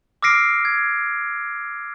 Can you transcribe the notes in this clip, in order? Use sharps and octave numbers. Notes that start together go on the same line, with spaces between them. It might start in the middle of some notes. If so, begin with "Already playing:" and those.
D6 E6 F6 A#6 C7 D7
G#6